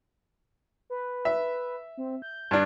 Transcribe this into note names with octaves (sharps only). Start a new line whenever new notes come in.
B4
E5
C4
G6
G2 D4